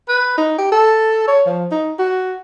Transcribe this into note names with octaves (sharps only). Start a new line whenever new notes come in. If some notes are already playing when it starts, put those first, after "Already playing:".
B4
D#4
G4
A4
C#5
F3
D#4
F#4